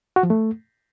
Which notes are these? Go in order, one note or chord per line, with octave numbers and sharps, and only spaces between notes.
F#4
F3
A3